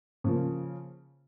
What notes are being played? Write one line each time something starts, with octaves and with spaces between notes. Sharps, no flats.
C#3 F3 A#3